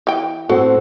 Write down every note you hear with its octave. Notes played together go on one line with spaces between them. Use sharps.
E3 G5
A2 C4 F#4 A4 C5 F#5